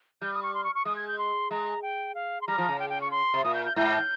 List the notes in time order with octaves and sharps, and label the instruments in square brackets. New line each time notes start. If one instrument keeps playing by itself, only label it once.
[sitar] G3 [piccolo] G6
[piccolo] D#6
C#6
C6
C#6
C#6
[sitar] G#3 [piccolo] D#6
[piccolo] G#6
G6
C6
[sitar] G#3 [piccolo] A#5
[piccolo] G5
F5
C6
[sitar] G3 [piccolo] A#5
[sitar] F3
C#3
[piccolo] G5
G5
C#6
C6
[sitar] C3
[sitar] A#2 [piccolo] D#6
[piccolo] G6
G6
[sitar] G#2 [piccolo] G6